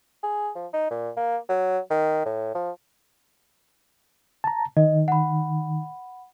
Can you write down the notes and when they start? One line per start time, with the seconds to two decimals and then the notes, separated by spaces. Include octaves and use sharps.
0.23 G#4
0.55 F3
0.73 D#4
0.90 A#2
1.16 A#3
1.49 F#3
1.90 D#3
2.26 A2
2.55 F3
4.44 A5 A#5
4.77 D#3 D#5
5.08 F#5 B5